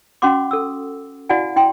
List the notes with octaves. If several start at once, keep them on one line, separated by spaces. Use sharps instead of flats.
C#4 F#4 F#5 C6 D6
A4 E6
E4 F#4 D5 F5 F#5 G#5
E4 G5 C6